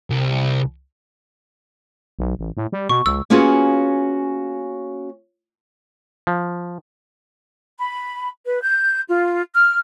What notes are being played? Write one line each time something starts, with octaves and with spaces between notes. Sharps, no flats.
C2
B1
A1
A2
G3
B2 C#6
C#2 E6
A#3 B3 C#4 F4 F#4 G#4
F3
B5
B4
G6
F4
F6